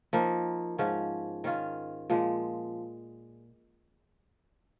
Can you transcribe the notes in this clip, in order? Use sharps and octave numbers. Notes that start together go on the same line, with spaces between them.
F3 A#3 D#4
G#2 F3 C#4
D#3 C#4 F4
A#2 F3 G#3